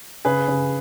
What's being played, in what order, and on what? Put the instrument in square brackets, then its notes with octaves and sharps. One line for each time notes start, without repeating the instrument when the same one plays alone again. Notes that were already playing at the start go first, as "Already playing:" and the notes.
[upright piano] C#3 [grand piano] G#4 B4
[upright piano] C#3